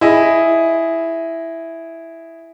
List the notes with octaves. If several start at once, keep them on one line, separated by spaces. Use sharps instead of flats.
E4 G#4 D#5